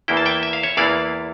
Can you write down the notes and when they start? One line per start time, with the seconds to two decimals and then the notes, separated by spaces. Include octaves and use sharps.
0.08 E2 E3 A#3 E4 G5
0.17 A5
0.25 E5 G5
0.43 E5
0.53 F5
0.63 C#5 E5
0.77 E2 E3 A#3 E4 D5 F5